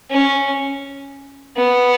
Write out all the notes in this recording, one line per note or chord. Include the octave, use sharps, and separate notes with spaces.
C#4
B3